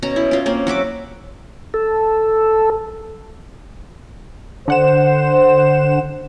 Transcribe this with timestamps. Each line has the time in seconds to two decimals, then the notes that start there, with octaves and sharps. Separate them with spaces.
0.02 B2 C#4 A#5
0.16 E4
0.31 C#4 F4
0.46 A#3 C4 C#4
0.67 F#3 F#4 E5 D6
1.74 A4
4.68 D3 C5 F#5 E7